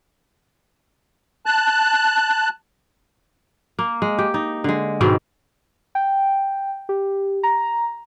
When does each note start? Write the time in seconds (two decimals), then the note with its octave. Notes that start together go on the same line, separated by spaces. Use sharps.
1.46 A5 F#6
3.79 A#3
4.02 G#3
4.19 G4
4.34 D#4
4.64 D3 G#3
5.01 G#2 B2 D#3 C4
5.95 G5
6.89 G4
7.43 A#5